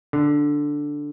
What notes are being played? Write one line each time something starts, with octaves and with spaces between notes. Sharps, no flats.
D3